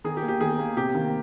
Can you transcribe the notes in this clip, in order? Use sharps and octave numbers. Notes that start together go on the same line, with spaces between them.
D#3 G#4
G4
A#3
G4
D#3 G#4
A#3
C3 G4
D#3 A#3